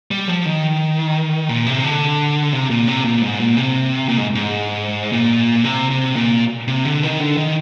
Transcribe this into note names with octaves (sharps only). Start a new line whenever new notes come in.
G3
F3
D#3
A#2
C3
D3
C3
A#2
C3
A#2
G#2
A#2
C3
A#2
G#2
G#2
A#2
C3
C3
A#2
C3
D3
D#3
D3
D#3